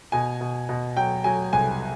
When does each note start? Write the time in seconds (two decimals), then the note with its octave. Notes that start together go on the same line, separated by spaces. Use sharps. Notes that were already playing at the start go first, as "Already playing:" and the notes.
0.12 B2 G#5
0.41 B2
0.69 B2
0.97 F#3 G5
1.24 F#3 G#5
1.53 C2 G#5